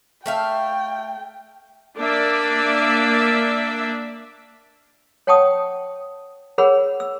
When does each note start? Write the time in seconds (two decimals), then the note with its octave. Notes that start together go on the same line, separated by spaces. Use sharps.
0.26 A3 E5 F5 G5
1.98 A#3 D4 D5 E5
5.27 C#5 F#5 G5 A5 C#6 D#6
6.58 G#4 A#4 C#5 F#5 B5 E6
7.00 E6